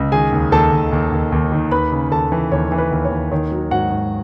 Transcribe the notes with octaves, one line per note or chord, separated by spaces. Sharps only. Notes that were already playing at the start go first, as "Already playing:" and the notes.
Already playing: C#2
D#3 G#4 G#5
D#2
D#2 A4 A5
D#2
D#2
D#2
D#2
D#3
D#2 B4 B5
C#3
D#2 A4 A5
E3
D#2 C#5
E3
B4
D#2
C#5
D#2
D#3 C#5
F#3
G#2 F#4 F#5
G#2